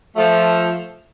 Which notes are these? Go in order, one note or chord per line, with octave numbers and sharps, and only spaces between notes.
F3 A3